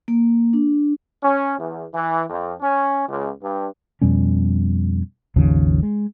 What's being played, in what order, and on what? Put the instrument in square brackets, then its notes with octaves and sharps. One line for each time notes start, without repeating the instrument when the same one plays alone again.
[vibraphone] A#3
D4
[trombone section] C#4
E2
E3
F2
C#4
C#2
G2
[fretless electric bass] F2 B2 G3 C#4
G#1 D#2 C#3 F3
G#3